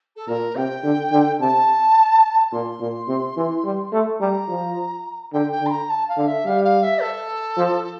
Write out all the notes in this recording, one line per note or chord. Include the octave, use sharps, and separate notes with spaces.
A4
A#2 A#4
C3 G5
D3
D3
C3 A5
A#2 C6
A#2
C3
E3
G3
A3
G3 A#5
F3
D3 G5
G5
D3
C6
A#5
A5
F5
D3
E5
G3 F5
F5
E5
A4
F3